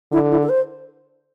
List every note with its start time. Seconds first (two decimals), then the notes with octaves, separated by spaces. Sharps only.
0.12 D3 E4
0.31 E4
0.43 A4
0.49 C5